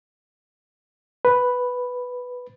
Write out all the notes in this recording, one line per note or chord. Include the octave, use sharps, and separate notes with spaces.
B4